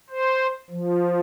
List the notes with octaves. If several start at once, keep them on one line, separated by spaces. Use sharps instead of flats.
C5
F3